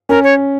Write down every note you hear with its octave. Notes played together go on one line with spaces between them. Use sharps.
C#4 A#4
C#5